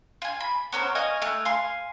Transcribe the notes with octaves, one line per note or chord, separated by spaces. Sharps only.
F4 G#5
B5
B3 C#4 A#4 C5
D#5 F5 G#5 C#6
A3 G#5 F6 F#6
F5 G#5 C6